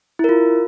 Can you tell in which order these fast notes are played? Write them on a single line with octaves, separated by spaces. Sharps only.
E4 A#4 F4